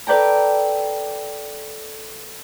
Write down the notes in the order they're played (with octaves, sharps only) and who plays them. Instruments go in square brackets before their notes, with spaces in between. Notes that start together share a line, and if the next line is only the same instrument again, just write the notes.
[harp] A4 B4 D5 G5 A#5